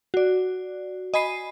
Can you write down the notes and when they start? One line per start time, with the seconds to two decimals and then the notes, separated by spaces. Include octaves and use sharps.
0.14 F#4 D5
1.14 D#5 G#5 B5 C7 D#7